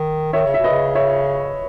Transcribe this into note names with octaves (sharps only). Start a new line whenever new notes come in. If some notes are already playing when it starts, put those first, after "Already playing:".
Already playing: D#3
D#3 C#5 E5
C#3
B2 E5
B4 D#5
C#3
C#5 E5